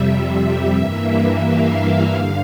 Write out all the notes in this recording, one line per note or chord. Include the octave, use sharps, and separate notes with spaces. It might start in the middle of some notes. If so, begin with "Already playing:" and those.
Already playing: F2 C3 G3 E5
G2 E3 A#3 E5
F5
G2 D3